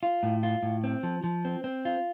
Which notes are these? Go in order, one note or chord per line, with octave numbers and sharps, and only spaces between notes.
F4
A2
F4
A2
C4
F3
F3
C4
C4
F4